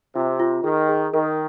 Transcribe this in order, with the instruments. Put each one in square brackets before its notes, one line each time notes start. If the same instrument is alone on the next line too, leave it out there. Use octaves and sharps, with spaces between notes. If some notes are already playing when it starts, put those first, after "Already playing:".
[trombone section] C3 [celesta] F4
[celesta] F4
[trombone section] D#3 [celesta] G#4
[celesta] G#4
[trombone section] D#3 [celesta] A#4